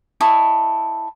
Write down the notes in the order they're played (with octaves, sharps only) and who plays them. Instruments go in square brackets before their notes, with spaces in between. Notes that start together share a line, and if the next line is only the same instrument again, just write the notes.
[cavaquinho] E4 A4 D#5 C#6